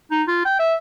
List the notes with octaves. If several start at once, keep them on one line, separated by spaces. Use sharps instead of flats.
D#4
F4
G5
E5